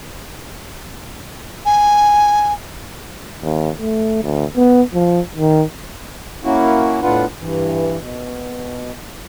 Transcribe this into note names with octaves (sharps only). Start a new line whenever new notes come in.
G#5
D#2
A3
D2
B3
F3
D#3
A#3 C#4 E4 F#4
A2 B3 D4 F4 B4 F#5
G2 E3
B2